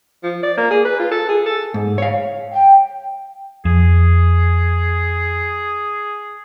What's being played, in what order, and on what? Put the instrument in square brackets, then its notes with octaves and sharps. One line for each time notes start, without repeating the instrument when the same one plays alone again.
[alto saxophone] F3
D5
A#3
G#4
B4
F4
A4
G#4
A4
[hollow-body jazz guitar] G#2
C#5 F5
[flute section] G5
[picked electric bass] F2 [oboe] G#4